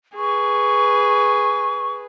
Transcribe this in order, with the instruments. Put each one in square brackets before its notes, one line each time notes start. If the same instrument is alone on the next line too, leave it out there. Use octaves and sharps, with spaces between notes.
[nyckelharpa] G#4 B4 [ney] C#6